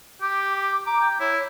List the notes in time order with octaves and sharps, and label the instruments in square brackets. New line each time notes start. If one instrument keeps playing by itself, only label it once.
[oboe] G4 [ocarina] D6
[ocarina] A#5 [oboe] D6
[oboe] G5
[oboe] E4 [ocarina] C#5